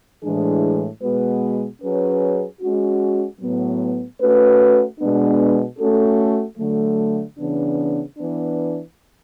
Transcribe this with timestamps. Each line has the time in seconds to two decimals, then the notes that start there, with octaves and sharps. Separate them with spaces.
0.22 A2 E3 G#3 D4 G#4
1.01 B2 G#3 B3 F#4 B4
1.81 F#3 C#4 G#4 B4
2.60 G#3 C#4 F#4
3.40 A2 F#3 B3
4.20 A3 C#4 F#4 B4
4.99 B2 G#3 B3 D4
5.78 A3 C#4 F#4 A4
6.57 D3 F#3 A3
7.37 C#3 E3 B3 D4
8.17 E3 B3 D4